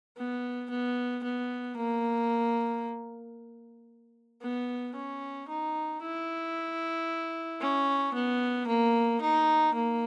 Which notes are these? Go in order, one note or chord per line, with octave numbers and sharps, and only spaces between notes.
B3
B3
B3
A#3
B3
C#4
D#4
E4
C#4
B3
A#3
D#4
A#3